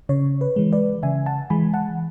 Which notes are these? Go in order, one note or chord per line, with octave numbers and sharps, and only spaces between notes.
C#3 C#5
B4
E3 G#3
B4 D5
C#3 E5 G#5
F#5 A5
E3 G#3 G#5 B5
F#5 A5